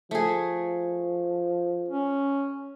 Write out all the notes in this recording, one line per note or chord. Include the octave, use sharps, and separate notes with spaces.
F3 A3 G#4
C#4